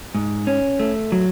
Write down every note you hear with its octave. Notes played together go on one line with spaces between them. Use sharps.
G#2
C#4
A3
F#3